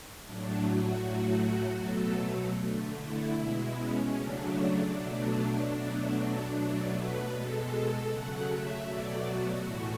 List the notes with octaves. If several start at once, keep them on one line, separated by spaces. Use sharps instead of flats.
A2 F#3 A3 D4
F#4
A2 F#3 A3
B2 F#3 A3 A4
D3 A3
E4
B2 G#3 E4
C#4
C#3 F#3 A3 D4
D4
B2 F#3 A3 D4
B2 F#3 A3
D4
B2 F#3 A3
B4
B2 G#3 A4
C#3 F#3 A3 F#5
E5
B2 F#3 A3 D5
F#4
A2 E3 A3